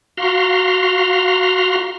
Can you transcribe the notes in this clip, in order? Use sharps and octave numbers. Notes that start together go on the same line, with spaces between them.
F#4 F5 A#5 C6